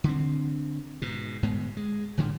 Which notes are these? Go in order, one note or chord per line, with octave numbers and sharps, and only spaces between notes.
D3 C4
G#2 B2
G1 G#2 G#3 B3
G#3
G#1 A2 D3 F3